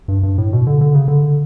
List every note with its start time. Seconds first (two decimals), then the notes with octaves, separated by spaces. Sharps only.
0.08 G2
0.23 G2
0.38 A2
0.53 B2
0.67 D3
0.81 D3
0.95 C#3
1.08 D3